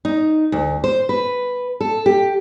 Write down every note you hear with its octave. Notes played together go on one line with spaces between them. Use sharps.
D#4
D2
C5
B4
A4
G4